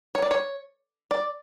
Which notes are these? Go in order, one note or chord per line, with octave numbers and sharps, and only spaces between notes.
C#5
D5
C#5
D5